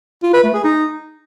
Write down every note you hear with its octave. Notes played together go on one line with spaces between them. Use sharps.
F4
B4
A3
G#4
D#4